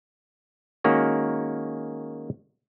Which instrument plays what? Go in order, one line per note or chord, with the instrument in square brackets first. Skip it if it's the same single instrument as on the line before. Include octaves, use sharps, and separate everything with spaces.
[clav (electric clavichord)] D#3 G#3 A#3 C#4 F#4